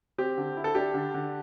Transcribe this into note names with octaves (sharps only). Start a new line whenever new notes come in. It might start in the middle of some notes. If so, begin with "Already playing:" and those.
C4 G4
D3
E4
A4
D4 G4
D3
D3